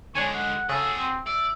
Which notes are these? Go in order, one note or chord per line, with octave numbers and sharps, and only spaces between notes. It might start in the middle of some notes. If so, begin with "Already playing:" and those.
D3 G#3 D4 C#5 G#5 C#6
F#5
C#3 F#4 G#4 A4
C4
D5 E5